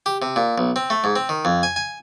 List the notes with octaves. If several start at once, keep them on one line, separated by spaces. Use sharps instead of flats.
G4
C3
A#2
B1
C4
A3
G#2
C4
D#3
F2
G#5
G#5